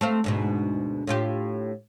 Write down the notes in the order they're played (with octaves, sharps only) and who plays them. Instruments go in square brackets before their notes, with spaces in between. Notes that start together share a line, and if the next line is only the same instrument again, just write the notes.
[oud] A3 C4 F5
D2 G#2 B2
A2 F4 G4